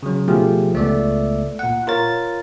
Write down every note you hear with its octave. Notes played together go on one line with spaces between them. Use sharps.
C#3 F#3
B2 F3 A3 F4 G4 G#4
C#2 A3 B3 D5 E5
A#2 F#5
F4 A#4 C#5 A6